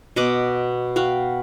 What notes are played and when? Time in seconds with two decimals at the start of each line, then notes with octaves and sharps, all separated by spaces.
0.16 B2 D#5 F#5 D6
0.96 F#4 F5 G5